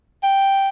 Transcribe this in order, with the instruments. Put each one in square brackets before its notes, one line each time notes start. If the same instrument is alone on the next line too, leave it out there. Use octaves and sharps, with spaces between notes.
[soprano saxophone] G5